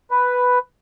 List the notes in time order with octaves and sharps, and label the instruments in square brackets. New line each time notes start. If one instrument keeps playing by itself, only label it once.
[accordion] B4